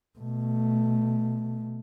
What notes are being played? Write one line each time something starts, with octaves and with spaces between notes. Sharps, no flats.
B2 A3